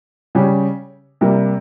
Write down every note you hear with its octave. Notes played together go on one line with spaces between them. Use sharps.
C#3 G3 C#4 G4
C3 G3 A#3